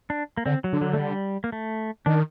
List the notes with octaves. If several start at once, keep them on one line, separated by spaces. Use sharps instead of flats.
D4
A#3
D3 C4
F#3
D3
F#3
A3
G3
A#3
A3
D#3 D4